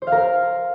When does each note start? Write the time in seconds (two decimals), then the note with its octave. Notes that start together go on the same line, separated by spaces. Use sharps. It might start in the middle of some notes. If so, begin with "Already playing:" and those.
0.02 C5
0.07 F5
0.12 A#4